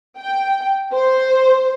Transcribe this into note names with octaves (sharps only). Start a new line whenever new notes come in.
G5
C5